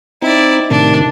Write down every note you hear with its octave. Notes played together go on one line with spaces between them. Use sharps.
C4 D#4 E4 D5
A2 C3 D#3 D4